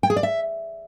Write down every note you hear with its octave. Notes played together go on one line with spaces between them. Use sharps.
G5
G#4
D5
E5